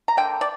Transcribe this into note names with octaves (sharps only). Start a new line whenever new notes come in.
A#5
D3 A#3 G5
D5